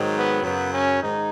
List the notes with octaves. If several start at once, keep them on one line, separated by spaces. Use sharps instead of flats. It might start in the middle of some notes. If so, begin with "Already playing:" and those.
Already playing: G#2 D#3 F#3
B3
F#2 C#3 F#3 B3
C#4
G#2 D#3 D#4